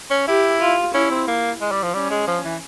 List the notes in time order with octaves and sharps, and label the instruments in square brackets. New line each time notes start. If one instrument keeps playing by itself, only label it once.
[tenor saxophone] C#4
[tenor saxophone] E4 [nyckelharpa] G4
[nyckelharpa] F4
[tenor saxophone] C#4 [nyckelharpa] E4
[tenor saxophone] C4
A#3
G#3
G3
F3
[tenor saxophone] G3 [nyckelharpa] C#4
[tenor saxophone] G#3
F3
E3